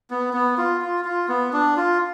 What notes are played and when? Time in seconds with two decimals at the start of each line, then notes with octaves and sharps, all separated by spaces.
0.11 B3
0.33 B3
0.58 F4
0.81 F4
1.05 F4
1.28 B3
1.53 D4
1.77 F4